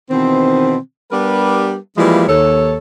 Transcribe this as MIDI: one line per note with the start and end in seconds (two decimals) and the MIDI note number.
0.10 0.76 47
0.10 0.76 51
0.10 0.76 52
0.10 0.76 60
1.12 1.75 55
1.12 1.75 59
1.12 1.75 62
1.12 1.75 67
1.12 1.75 70
1.12 1.75 71
1.97 2.28 52
1.97 2.28 53
1.97 2.28 55
1.97 2.28 56
1.97 2.28 58
1.97 2.28 64
2.28 2.77 39
2.28 2.77 69
2.28 2.77 73